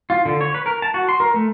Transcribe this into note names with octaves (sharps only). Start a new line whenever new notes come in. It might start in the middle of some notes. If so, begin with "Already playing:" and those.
F4
D3
C#5
B4
A#4
A5
F#4
C6
A#4
A3